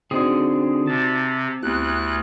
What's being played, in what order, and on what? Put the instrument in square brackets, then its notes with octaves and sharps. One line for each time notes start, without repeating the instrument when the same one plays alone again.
[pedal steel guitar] D3 G#4 [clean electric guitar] C4 [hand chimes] D#4 F#4 D5
[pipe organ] C3 [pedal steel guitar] A5
[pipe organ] D2 F#6 [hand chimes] B3 E4 G4